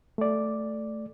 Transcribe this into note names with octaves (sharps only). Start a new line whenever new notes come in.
A3 D5